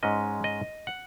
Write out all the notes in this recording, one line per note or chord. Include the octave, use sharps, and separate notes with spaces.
G#2 G#3 C#4 D#5
D#5
F#5